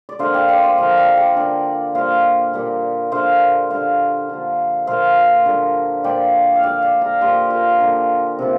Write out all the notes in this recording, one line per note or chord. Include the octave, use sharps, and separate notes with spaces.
D5
D3 A#3 C5 F5
D5 G5
D5 G5
C5 F5
D3 F3 A#3 F5 A#5
D5 G5
A#5
D5 G5
D3 A#3 D5 G5
A#2 G3 A#3 C5 F5
A#2 G3 A#3
D3 A#3 C5 F5
D3 G3 A#3 C5 F5
D3 F3 A#3
A#2 F3 A#3 C5 F5
D3 G3 A#3
A#2 F3 A#3 D5 G5
F5
D3 A#3 D5 G5
D5 G5
F5 A#5
A#2 A#3 G4 C5
F4 A#4
D3 A#3
C3 F3 A#3